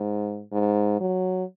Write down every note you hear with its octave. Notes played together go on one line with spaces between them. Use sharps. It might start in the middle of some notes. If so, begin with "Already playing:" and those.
Already playing: G#2
G#2
F#3